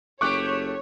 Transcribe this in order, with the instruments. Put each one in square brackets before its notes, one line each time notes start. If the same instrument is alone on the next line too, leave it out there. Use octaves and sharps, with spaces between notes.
[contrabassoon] F#1 [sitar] A3 G4 [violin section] C#5 [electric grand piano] C#6 D6 F#6